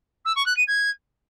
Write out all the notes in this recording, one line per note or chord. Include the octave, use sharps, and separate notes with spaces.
E6
C#6
F#6
D#7
G#6